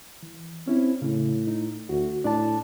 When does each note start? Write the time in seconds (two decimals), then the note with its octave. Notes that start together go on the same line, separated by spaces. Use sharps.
0.23 E3
0.68 C4 C#4 E4
1.02 A2 C#3
1.47 D#4
1.89 D2 F#4
2.24 A2 D4 D5 A5